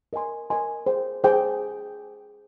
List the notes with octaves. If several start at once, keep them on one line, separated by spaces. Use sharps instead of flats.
A#4 D#5 G#5 C6
A#4 D#5 G#5 C6
G#4 C5 G5
G#4 C5 G5